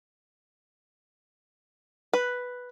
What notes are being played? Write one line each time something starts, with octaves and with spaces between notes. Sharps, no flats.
B4